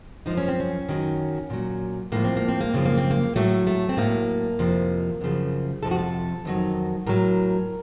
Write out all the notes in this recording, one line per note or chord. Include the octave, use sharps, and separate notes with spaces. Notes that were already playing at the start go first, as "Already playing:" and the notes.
F#2 F3 D#4
C#4
C4
C#4
F#2 D#3 F#3
A#2 F#3
A2 F3 A#3
C4
A#3
C4
A#3
F#2 C#3 F3 C4
A#3
C4
A#3
A2 F#3 A3
A3
C4
A2 F#3 A#3
F2 C3 F3
F#2 C#3 F3
F2 C3 F3 A4
F#4
A4
F2 D#3 F#3
A2 F#3 A#4